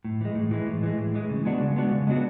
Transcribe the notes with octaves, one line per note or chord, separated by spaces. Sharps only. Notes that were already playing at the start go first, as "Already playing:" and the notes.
A2
E3 G#3
A2
E3 G#3
A2
E3 G#3
A2
E3 G#3
C#3
G#3 B3 D4 F#4
C#3
G#3 B3 D4 F#4
C#3
G#3 B3 D4 F#4